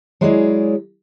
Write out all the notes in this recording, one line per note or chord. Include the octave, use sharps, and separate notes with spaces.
F#3 G#3 E4 G#4 C#5 D5